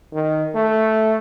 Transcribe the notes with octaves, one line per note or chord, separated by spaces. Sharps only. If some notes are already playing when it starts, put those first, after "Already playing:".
D#3
A3